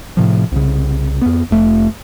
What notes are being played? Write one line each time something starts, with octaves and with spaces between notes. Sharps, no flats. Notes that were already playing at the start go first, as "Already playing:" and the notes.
A2 C3 F3
C2 C#3
F2 B3
F1 A3